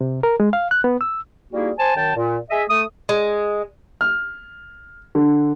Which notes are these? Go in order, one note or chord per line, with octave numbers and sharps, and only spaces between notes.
C3
A#4
G#3
F5
F#6
B3
E6
G3 A#3 D#4 E4 F#4 G#4
C5 G#5 A5
F#2 D#3 G5 A5
A#2
G#4 D#5 E5
A3 D#6
G#3
F6
D3